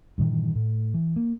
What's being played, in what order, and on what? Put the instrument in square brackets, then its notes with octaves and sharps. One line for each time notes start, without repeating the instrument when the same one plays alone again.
[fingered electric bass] G2 A#2 D#3 E3
A2
E3
A#3